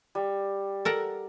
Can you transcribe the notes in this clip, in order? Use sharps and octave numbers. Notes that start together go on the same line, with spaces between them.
G3
A4 A#4 F#5